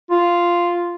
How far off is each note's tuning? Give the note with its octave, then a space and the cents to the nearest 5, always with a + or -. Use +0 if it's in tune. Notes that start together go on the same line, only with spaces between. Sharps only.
F4 -5